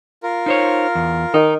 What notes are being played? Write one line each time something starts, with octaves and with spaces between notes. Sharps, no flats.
F4 A#4
D#4 C5 C#5
E2
D#3 D#4